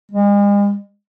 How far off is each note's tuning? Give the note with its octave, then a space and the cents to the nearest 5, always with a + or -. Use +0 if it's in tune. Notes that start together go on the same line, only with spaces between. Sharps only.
G#3 -40